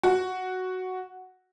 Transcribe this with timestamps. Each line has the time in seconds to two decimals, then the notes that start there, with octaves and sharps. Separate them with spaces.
0.03 F#4